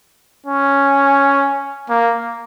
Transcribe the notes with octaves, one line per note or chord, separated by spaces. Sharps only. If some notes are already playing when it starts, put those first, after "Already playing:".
C#4
A#3